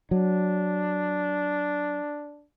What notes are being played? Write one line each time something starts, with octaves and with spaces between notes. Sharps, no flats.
F#3 D4